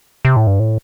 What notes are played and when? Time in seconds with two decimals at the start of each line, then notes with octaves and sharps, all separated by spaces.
0.25 C3
0.36 A2
0.47 G2
0.60 A2